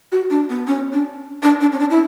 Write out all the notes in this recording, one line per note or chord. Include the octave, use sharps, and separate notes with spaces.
F#4
D4
B3
C#4
D4
D4
D4
C#4
D4
E4